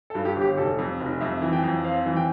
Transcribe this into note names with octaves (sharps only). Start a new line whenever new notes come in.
A4
G2
G4
G1
G4
F1 A4
F2
F1
F2 E5
E3
G5
F2
C4 F5
E3
G5